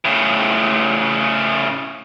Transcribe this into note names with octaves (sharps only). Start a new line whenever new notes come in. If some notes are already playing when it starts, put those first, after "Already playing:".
A2 C#3